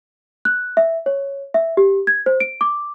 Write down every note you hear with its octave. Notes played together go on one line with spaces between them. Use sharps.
F#6
E5
C#5
E5
G4
G#6
C5
D7
D6